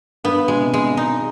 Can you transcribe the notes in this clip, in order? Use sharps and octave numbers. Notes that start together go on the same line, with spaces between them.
G2 B3
B2 G#3
C3
C3 G#3
D#4